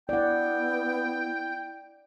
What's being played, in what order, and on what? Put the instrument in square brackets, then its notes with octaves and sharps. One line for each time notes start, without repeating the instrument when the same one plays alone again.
[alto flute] B3 [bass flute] E4 [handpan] D5 F#5 [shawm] G5